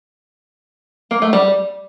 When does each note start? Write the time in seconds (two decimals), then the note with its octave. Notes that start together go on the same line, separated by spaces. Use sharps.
1.11 A#3
1.22 A3
1.33 G3